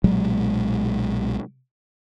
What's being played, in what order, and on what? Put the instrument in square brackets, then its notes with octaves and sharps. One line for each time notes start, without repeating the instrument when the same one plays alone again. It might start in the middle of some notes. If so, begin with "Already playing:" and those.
[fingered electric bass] B1 A#2 F#3 G#3